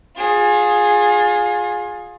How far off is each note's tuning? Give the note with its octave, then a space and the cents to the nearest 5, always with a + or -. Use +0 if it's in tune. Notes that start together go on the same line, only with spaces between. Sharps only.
F4 +30 G#4 +0